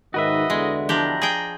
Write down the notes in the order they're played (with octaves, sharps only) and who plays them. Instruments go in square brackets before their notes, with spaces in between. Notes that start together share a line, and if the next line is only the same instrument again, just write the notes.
[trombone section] G#2 D#3 [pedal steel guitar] F#4 B4 E5 [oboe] D#5
[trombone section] E2 D3 [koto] G#3
[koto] F3 D4 G4 [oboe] A#5
[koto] G#4 G5